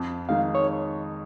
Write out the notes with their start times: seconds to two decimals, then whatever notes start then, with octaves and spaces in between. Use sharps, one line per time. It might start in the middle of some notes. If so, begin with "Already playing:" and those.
Already playing: F2
0.29 D#3 G#3 D#4 F5
0.55 C#5